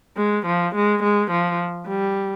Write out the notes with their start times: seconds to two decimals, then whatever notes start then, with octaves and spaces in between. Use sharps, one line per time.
0.17 G#3
0.46 F3
0.75 G#3
1.03 G#3
1.31 F3
1.88 G3